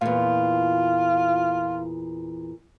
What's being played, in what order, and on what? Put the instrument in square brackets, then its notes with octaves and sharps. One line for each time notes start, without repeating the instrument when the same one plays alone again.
[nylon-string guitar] E2 A#2 [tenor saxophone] F4